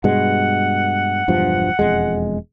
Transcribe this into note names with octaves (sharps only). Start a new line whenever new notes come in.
G2 B2 G#3 F#5
E1 G2 F3
E1 F2 G#3